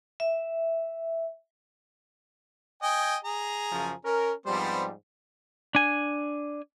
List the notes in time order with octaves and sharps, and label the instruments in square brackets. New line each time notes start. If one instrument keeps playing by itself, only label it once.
[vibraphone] E5
[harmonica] D#5 G5 G#5
G#4 A#5
[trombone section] F#2 C#3 F3
[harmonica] C#4 [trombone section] A#4
[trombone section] G#2 F3 G3 [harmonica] B3 C4 C5
[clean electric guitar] D4 G#5